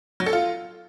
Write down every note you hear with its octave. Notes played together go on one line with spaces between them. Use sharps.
F#3
A4
F4